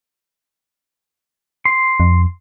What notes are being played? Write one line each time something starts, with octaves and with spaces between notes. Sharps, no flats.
C6
F2